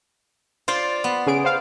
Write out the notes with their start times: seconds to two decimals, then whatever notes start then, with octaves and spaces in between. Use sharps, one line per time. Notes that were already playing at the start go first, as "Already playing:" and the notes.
0.68 F4 C5 D5
1.04 B3
1.27 C#3 G#4 D7
1.44 C5 F5